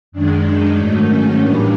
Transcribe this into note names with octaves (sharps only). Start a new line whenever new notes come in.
F#2 D#3 G#3 D4
D#4
G#2 D#3 F#3 A3 D#4
C#4
A2 E3 G3 A#3 D4